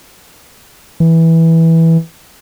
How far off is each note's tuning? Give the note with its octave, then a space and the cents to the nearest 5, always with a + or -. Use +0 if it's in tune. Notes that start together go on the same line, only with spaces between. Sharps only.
E3 -10